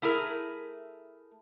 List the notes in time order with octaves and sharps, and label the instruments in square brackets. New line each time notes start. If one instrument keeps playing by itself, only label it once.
[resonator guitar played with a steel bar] A3 E4 G#4 A#4